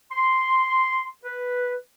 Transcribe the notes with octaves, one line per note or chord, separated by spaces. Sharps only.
C6
B4